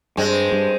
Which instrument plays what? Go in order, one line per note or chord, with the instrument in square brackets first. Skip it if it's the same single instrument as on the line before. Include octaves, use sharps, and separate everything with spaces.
[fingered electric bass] G2 [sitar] G#3 C4
[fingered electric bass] G2